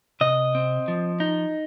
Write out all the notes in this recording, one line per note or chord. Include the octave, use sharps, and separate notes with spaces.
C3 D#5
C4
F3
D#4